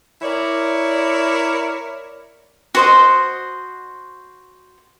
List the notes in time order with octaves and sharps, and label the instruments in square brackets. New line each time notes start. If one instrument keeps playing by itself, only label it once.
[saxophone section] E4 A#4 C#5 D5
[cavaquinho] F#4 C5 D#5